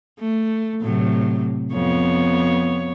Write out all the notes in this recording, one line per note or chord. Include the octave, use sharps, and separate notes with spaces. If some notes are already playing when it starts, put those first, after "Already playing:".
A3
A2 C3 F#3
F2 B3 C#5